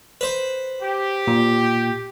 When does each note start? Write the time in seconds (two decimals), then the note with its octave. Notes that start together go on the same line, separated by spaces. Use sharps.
0.21 B4 C5
0.82 G4
1.27 A#2